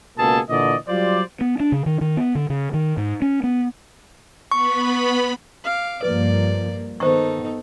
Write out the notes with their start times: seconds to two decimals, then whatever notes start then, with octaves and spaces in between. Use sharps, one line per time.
0.17 C#2 B2 A#3 G#4 A4 A5
0.50 A#2 D3 E3 D5 D#5
0.88 F#3 G3 F4 C5 D5
1.41 B3
1.60 D4
1.72 C#3
1.86 D#3
2.01 D#3
2.17 B3
2.35 D3
2.50 C#3
2.74 D#3
2.97 G#2
3.22 C#4
3.43 B3
4.52 B3 B5 C#6
5.64 F5 D6
6.03 G2 F3 A#3 B4 D5
7.00 D#3 B3 D#4 A4 C5 C#6